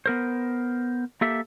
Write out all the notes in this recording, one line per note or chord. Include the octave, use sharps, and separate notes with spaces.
B3 A#4 C5
A#3 G4 A4 E5